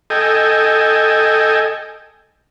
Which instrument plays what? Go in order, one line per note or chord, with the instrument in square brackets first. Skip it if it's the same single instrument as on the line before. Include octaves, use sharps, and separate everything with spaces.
[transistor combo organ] A4 D#5 G5 G#5